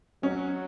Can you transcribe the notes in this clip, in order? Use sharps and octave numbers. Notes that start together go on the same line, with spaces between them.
F#3 C#4